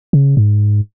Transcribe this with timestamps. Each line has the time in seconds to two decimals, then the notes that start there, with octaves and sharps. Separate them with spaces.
0.13 C#3
0.37 G#2